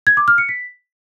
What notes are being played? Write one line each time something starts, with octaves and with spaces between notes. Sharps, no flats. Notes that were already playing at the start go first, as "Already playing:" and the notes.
G#6
D6
F6
C#7
B6